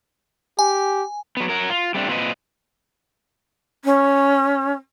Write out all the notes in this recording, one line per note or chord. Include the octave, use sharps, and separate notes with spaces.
G4 G#5
F#3 B3
F#3 A#4
F4
G3 A3 C4 D4
A#2 C4 G4 B4 D#5
C#4